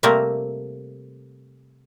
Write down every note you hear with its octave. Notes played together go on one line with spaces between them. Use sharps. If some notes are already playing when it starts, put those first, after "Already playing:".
C3 G3 A3 A#3 C4 A#4